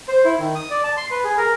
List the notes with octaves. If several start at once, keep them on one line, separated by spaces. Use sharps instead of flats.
C5
E4
D#3
D#6
D5
A5
C6
B4
G#4
A#4